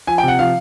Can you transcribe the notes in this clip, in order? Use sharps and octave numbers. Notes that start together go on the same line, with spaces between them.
F3 G#5
C3 G5
F#5
F3 F5